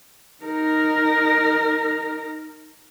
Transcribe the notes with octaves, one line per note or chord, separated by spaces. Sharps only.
D#4 A#4